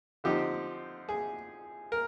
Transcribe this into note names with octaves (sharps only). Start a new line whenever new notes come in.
D3 F3 C4 D#4 G4
G#4
A#4